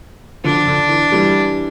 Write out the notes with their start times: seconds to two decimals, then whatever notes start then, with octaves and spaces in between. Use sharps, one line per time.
0.44 D3 F3 D4
0.68 D3
0.89 E3
1.12 E3 G3